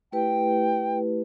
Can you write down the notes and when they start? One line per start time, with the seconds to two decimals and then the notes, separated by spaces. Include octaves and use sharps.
0.12 A3 E4 G4 B4 G5